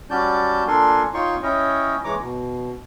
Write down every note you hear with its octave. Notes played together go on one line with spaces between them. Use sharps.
G3 C#4 F#4 D5 A5 G6
A#2 D4 A4 A#4 G#5 C6
D#4 F4 C#5 G5 C6 C#6
C#4 E4 C#5 D#5 G5
E3 G#3 C#5 A#5 D6
B2